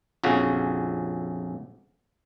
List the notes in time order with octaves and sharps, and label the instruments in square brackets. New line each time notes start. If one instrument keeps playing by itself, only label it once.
[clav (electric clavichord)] A#1 F2 C#3 F#4